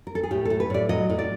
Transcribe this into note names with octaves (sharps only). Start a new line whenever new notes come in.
A#4
A4
G#4
A2 G4
A2 A4
B4
A2 D5
F#3 D#5
A2
D5